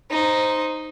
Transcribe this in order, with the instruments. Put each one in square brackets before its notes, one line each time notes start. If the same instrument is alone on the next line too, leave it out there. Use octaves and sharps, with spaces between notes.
[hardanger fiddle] D#4 C5